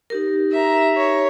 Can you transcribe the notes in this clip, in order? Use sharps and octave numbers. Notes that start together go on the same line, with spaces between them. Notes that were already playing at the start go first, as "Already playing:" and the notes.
D#4 G4 A#4
E5 A#5
C#5